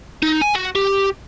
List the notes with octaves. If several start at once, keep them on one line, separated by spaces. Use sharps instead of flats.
D#4
G#5
F#4
G4